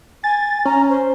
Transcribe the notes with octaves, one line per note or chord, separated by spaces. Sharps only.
G#5 A6
C#4 A#5
C5